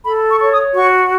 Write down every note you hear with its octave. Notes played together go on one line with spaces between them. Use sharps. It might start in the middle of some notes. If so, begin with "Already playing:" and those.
A4 B5
C#6
C#5 C#6
D#6
F#4 C#6